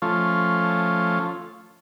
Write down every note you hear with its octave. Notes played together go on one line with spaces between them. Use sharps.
F3 A3 C#4 F4